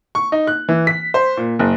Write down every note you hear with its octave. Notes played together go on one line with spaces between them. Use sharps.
C#6
D#4
F#6
E3
B6
C5
A#2
F#1